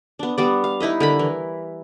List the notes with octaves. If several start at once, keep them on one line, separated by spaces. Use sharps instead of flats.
B3 D4
G3 B3 D5
F5
D#4 E4 B4 D#5
D3 A#4 B5
E3